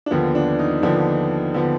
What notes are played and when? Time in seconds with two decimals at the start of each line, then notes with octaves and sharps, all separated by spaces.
0.06 D4
0.11 D#2 D3 F3 B3
0.35 D4
0.59 D#4
0.82 D#2 D3 F3 B3 D4
1.54 D3 F3 B3